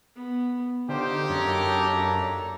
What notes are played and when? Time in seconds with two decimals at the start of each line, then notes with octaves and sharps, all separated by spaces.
0.15 B3
0.89 D3 D#4 F4 G4 C5
1.29 F#2 A#3 D4 A4 C#5 A#5